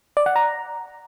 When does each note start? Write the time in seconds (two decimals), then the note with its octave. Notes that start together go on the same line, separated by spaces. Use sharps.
0.17 D5
0.26 F#5
0.36 A#5